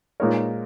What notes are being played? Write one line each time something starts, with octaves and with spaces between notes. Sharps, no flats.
A#2 G#3 D#4 A#4 C#5